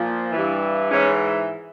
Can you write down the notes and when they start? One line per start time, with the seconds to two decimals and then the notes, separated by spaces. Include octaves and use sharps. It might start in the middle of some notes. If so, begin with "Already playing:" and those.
Already playing: A#2 F3
0.32 G2 E3
0.90 G#2 E3 C#4